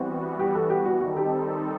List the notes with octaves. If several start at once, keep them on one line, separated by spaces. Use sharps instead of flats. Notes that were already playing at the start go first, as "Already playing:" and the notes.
Already playing: E3 G3 B3 C4 F#4
G4
A4
G4
F#4
D#3 G3 C4 D#4 F#4 A4
G4